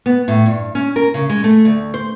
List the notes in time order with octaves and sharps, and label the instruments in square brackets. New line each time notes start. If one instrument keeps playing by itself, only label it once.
[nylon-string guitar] B3
A2
G2
C#4
A#4
C#3
G#3
A3
D2
C5